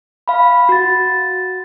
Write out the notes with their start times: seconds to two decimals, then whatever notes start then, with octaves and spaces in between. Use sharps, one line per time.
0.28 F5 B5
0.69 F#4 A6